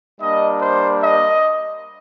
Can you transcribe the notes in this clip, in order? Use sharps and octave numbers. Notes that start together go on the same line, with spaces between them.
G3 A#3 D4 D#5
C5
D#5